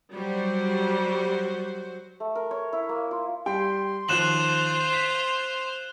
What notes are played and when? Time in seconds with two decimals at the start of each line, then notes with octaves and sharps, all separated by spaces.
0.15 F#3 G3 F#4 C5
2.20 A3
2.35 A#4
2.51 C#5
2.73 E4
2.89 A#3
3.11 F4
3.46 G3 G5 C6
4.09 D#2 F3 F4 C5 F#6 E7 F#7
4.93 B6